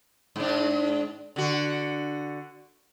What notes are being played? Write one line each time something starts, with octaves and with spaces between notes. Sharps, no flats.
G#2 D4
D3 F#4